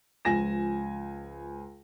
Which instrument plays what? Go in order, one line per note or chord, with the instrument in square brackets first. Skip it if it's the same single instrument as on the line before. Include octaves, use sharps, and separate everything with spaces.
[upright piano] C#2 F3 G#5 A#6 E7